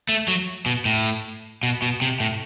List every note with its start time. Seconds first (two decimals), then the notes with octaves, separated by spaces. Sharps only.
0.09 A3
0.28 F#3
0.66 B2
0.85 A2
1.63 B2
1.82 B2
2.02 C3
2.20 A2